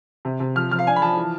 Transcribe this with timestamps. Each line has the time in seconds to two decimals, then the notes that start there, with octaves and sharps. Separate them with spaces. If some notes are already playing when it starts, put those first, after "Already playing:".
0.25 C3
0.40 C3
0.55 F3 F6
0.71 F3 F6
0.79 F5
0.87 D4 G#5
0.96 B5
1.02 F3 A5
1.17 E3